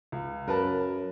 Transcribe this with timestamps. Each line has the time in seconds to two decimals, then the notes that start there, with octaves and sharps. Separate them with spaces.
0.12 C#2
0.48 F#2 A#4 B4 A5